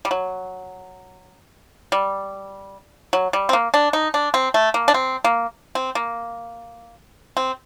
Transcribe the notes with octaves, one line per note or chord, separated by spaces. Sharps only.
G3
F#3
G3
F#3
G3
C4
A#3
D4
D#4
D4
C4
A3
A#3
D4
C4
A#3
C4
A#3
C4